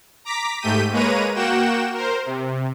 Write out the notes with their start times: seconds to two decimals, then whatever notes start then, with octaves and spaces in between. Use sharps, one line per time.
0.25 A#5 D6 B6
0.61 G#2 A3 G4 G6 B6 D#7
0.92 G#3 A#3 B4 C#5 A#5 D#7
1.35 A#3 F#4 F#5 G5 E7
1.94 A#4 C5
2.26 C3